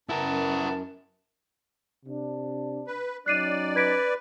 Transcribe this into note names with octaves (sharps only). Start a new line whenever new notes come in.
F#2 B3 E4 A#4 A5
C3 D4
B4
F#3 C#4 D#4 D5 F#6 C7 D#7
B4 G#6 B6 D7